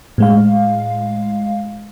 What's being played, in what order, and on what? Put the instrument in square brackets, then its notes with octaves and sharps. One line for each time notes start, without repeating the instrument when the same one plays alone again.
[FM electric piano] A2 G#3 F5